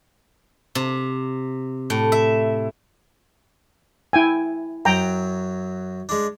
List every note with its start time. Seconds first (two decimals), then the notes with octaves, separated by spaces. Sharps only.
0.75 C3
1.90 A2
2.12 E5
4.13 E4 G5 G#5
4.85 F#2 F#3 G5 A#5
6.09 G#3 D4